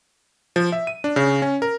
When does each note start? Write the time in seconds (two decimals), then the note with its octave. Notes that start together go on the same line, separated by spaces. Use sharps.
0.56 F3
0.72 E5
0.87 D#7
1.04 D4
1.16 C#3
1.42 C#4
1.62 A#4